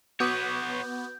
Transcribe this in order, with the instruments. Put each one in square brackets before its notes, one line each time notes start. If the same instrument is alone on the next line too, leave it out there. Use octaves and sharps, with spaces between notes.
[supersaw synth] B3 [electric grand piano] F#4 D6 D#6 [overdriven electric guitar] B4 C#5 [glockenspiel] G6